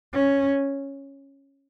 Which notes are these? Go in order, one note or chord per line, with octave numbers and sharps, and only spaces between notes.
C#4